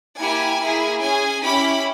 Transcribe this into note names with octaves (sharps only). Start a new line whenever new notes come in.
A#3 E4 G4 G#5
A#3 E4 G#4
C#4 G#4 G#5
C#4 E4 G4 B5